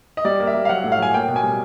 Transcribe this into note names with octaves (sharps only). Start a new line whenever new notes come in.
D#5
G3 D5
A#3
E5
G3
F5
F#3 F#5
A2
F5
F#3 G#5
A#3 G5
B2
G#5
G3